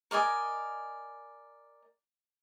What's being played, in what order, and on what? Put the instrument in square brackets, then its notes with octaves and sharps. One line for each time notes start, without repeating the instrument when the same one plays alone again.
[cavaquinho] A#4 D5 D#5 G#5